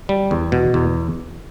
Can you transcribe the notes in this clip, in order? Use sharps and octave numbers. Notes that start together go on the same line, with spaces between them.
G3
E2
B2
E2